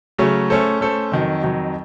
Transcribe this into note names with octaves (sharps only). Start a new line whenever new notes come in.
C#3 F#3 A3 C#4
A3 C#4 A4 C5
A3 C#4 A4 C5
F2 D#3 F#3
F2 D#3 F#3